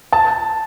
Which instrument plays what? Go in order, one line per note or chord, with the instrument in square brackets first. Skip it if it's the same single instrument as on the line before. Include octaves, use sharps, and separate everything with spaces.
[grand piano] A5